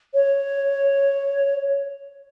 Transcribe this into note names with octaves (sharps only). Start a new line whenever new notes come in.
C#5